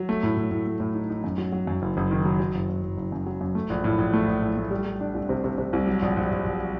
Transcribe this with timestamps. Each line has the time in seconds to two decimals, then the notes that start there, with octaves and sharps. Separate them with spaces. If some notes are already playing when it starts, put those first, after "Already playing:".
Already playing: F#3
0.09 A3
0.23 A2
0.37 A2
0.51 A2
0.66 A3
0.80 A2
0.95 D#4
1.10 D#4
1.24 F#2
1.38 F#3
1.52 F#3
1.67 F#2
1.82 F#1
1.97 F#1
2.11 D#3
2.25 F#3
2.40 F#3
2.55 F#1
2.69 F#1
2.83 F#1
2.97 F#1
3.12 F#2
3.26 F#3
3.41 F#2
3.55 A3
3.70 A#1
3.84 A2
3.98 A#1
4.13 A3
4.28 A#1
4.42 A2
4.57 A3
4.71 G3
4.85 G3
5.01 D4
5.14 C2
5.29 C3
5.44 C3
5.58 C3
5.73 C2
5.86 F#3
6.02 A#1
6.16 A#1
6.31 A#1
6.44 A#1